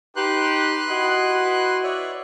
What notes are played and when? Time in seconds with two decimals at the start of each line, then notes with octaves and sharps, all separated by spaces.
0.16 D#4 G4 B4 C6 F#6
0.89 E4 F#4 D#5
1.83 C#5 D5 E5